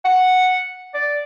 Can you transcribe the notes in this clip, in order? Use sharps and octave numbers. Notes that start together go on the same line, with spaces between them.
F#5
D5